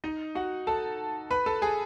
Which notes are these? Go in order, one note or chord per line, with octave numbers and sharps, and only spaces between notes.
D#4 D#5
F#4 F#5
A4 A5
B4 B5
A4 A5
G#4 G#5